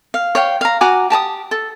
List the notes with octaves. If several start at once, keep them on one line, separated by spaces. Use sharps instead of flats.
F5
C#5 F5 G5
F5 A#5
F#4 G#5 A#5 D6
G4 A5 A#5 D#6
A4